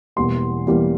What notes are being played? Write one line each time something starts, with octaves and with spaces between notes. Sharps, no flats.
E1 E2 E3 G3 A#3 C6
E1 E2 E3 G3 A#3